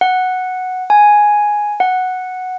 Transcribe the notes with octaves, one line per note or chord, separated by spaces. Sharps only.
F#5
G#5
F#5